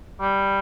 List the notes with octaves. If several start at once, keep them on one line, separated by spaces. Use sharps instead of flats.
G3